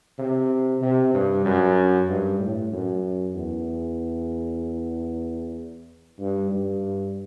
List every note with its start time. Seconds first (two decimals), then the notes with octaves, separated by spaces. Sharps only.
0.19 C3
0.82 C3
1.14 G2
1.45 F#2
2.08 G2
2.39 A2
2.72 F#2
3.35 E2
6.19 G2
6.51 G2